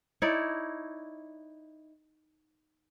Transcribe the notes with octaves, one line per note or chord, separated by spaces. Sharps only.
D#4 E4 C#5 D5